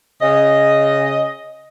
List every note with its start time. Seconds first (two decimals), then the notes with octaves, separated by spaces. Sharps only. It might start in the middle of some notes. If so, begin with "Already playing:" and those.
0.21 C#3 D#5